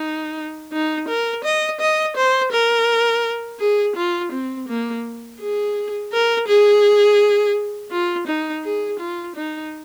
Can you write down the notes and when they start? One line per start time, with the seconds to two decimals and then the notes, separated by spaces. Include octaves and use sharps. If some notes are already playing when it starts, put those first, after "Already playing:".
Already playing: D#4
0.73 D#4
1.09 A#4
1.44 D#5
1.81 D#5
2.17 C5
2.52 A#4
3.60 G#4
3.96 F4
4.32 C4
4.68 A#3
5.40 G#4
6.13 A#4
6.48 G#4
7.91 F4
8.27 D#4
8.64 G#4
8.99 F4
9.36 D#4